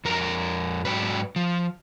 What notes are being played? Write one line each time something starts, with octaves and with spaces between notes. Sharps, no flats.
F2 A#4 A#5
G#2 F#3 B4
F3